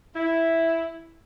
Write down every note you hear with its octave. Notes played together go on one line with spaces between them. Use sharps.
E4